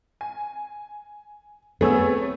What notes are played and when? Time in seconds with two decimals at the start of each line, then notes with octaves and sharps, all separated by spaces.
0.21 G#5
1.81 A3 B3 C4 G#4 C#5 E6